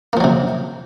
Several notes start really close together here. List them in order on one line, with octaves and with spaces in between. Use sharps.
A#3 F3 F#3 C3